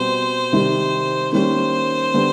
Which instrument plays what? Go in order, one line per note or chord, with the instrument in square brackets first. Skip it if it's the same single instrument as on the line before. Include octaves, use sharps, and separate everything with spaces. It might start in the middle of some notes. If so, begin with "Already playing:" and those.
Already playing: [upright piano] B2 G3 C4 [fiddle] C5
[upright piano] C3 D#3 G3 C4
[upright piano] D#3 G3 A#3 C#4 [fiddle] C5
[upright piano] D3 G3 B3